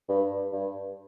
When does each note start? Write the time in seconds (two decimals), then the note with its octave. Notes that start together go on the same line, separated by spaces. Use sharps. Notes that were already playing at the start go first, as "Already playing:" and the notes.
0.09 G2
0.52 G2